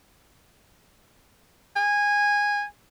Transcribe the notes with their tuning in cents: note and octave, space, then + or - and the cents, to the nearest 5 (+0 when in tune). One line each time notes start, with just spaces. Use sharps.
G#5 -15